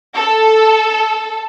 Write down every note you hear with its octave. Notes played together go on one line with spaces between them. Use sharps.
A4